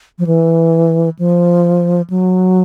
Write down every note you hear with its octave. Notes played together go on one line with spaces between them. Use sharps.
F3
E3
F3
F#3